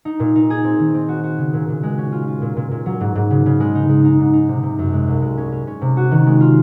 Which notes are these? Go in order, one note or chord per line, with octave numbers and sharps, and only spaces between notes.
D#4
A#2
D#4
G#4
C4
D#3
C4
F#4
F#4
C#3
A#2
A#2
G#3
C#4
F4
F4
A#2
A#2
A#2
F#3
G#2
G#2
C#3
C#3
G#3
D#4
G#3
D#4
G#2
D#4
C3
C3
F#2
G#3
C2
G#3
C#4
C#4
C#4
C3
F#4
D#3
G#3
F4